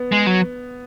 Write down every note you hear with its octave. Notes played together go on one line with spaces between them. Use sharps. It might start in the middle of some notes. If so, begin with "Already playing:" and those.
Already playing: B3
G#3
F#3